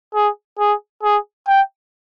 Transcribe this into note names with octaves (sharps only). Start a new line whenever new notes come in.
G#4
G#4
G#4
G5